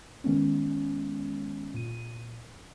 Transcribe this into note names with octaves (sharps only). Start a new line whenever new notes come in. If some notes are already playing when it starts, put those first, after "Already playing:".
D#3 G#3 B3 C#4
A#2 D#7